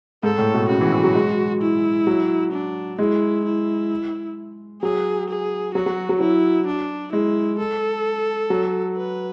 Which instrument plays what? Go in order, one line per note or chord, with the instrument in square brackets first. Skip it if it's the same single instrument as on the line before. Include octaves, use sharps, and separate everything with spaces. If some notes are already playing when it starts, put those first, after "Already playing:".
[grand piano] G#2 [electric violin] A4
[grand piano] A2
B2
[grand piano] C#3 [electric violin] F#4
[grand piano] E3
E3
F#3
G#3
[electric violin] E4
[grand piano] F#3
[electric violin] D4
[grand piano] G#3 [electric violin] E4
[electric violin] E4
[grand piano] F#3 [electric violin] G#4
[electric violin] G#4
[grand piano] F#3 [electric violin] F#4
[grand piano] F#3
F#3
[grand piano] F#3 [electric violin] E4
[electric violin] D4
[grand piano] G#3 [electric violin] E4
[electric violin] A4
[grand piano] F#3
[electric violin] B4